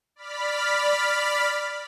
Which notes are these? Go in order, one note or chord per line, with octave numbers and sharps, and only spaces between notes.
D5 B5 F6 B6